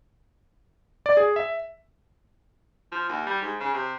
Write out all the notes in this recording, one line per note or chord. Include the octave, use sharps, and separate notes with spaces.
D5
G#4
E5
F3
D#2
G3
G#2
C#3
C3